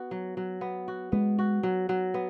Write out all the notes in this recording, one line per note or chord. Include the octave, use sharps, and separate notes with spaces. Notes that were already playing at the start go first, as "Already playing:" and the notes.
Already playing: B3 F#4
F#3
F#3
B3
F#4
G#3 B3
F#4
F#3
F#3
B3